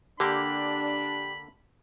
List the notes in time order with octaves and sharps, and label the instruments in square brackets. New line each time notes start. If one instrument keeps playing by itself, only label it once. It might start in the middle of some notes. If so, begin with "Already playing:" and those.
[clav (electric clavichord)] D3 A#3 [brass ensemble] D4 [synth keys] G4 [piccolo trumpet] B5